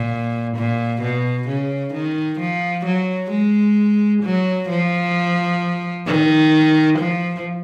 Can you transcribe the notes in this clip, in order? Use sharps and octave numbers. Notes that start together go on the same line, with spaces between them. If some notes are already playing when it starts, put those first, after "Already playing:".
Already playing: A#2
A#2
B2
C#3
D#3
F3
F#3
G#3
F#3
F3
D#3
F3